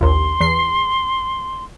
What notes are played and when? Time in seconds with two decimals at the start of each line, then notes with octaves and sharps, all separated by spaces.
0.01 A#1 D#2 C6
0.40 E2 C7